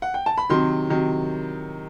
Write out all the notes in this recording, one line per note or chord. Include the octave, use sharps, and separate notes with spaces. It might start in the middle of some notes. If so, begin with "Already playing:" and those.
F#5
G5
A5
B5
C3 D#3 F#3 C6
C3 D#3 F#3